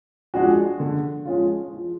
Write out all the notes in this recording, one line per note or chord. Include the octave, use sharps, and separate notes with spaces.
F3 G#3 D4 F#4
D3
F3 G#3 C#4 F4
F3